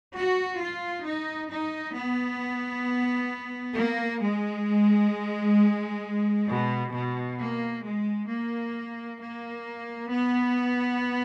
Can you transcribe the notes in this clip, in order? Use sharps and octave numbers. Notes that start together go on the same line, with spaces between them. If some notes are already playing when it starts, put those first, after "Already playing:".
F#4
F4
D#4
D#4
B3
A#3
G#3
B2
B2
A#3
G#3
A#3
A#3
B3